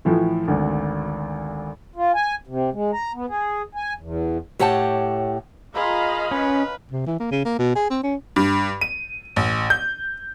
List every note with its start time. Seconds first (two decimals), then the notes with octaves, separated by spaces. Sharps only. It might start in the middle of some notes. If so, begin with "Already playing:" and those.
0.05 A2 E3 F3 A3
0.48 G#1 D2
1.96 F4
2.14 G#5
2.47 C3
2.73 G#3
2.94 A#5
3.14 B3
3.29 G#4
3.75 G#5
3.98 E2
4.59 A2 G4 C#5 F#5 G5 A5
5.75 F4 G#4 A#4 D#5 F5 B5
6.31 C#4 B4
6.92 C3
7.06 E3
7.20 A#3
7.31 C#3
7.45 A#3
7.59 B2
7.75 G#4
7.90 C4
8.03 C#4
8.36 G2
8.81 D#7
9.36 A1
9.70 G6